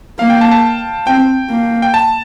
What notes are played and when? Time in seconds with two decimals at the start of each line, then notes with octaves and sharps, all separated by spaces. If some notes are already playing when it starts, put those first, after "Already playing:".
0.19 A#3 F5
0.30 G5
0.41 A5
0.51 A5
1.06 C4 G5
1.50 A#3
1.82 G5
1.94 A5